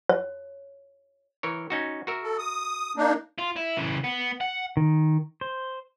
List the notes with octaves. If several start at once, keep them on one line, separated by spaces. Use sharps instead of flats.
C#5
E3 A#4 C#5
C#4 D#4 F#4
F#4 A#4 E5
A4
D#6
A#3 D4 D#4
F4
E4
C#3 E3
B3
F#5
D#3
C5